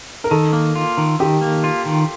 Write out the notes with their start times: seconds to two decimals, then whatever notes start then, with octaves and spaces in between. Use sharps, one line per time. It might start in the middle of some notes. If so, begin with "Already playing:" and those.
0.24 A#4
0.31 D#3 A4
0.53 A#3
0.76 F4
0.98 D#3
1.19 D#3 G4
1.41 A#3
1.64 F4
1.86 D#3